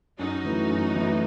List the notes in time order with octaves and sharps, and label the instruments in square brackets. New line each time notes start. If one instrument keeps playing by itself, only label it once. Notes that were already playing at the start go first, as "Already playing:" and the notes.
[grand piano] F#2 [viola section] D#4 F#4
[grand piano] E3 A3 E4
F#2
E3 A3 E4